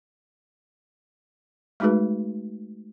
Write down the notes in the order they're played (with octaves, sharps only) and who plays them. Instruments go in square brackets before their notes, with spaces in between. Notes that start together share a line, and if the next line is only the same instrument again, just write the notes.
[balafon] G#3 A3 D#4 F#4 G#4 B4